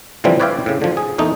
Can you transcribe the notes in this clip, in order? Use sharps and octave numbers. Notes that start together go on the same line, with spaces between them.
A2 D3 E3 F3 G3 C4
B4 C#5 D5 E5 F5 G5
A2 C#3
D3 F3
G#4
E2 A#2 A3 D#4